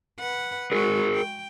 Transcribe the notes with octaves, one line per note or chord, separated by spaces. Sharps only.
B4 F#5
G#3 F#4 G#4 A#4
G5